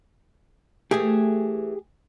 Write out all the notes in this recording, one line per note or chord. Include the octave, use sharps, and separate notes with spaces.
E3 A3 G4 G#4